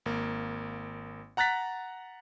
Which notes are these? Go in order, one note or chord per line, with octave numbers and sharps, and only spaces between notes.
G#1 A#3
F#5 A#5 F#6 A6 B6